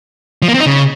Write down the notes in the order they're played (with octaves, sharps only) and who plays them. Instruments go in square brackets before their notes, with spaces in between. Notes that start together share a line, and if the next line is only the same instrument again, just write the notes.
[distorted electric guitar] F3
A#3
C4
D#4
C#3